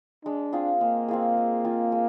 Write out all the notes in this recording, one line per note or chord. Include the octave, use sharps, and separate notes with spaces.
G#3 D4
C4 F4 G#4
G#3 A#3
C4 F4 G#4
G#3
C4 F4 G#4
G#3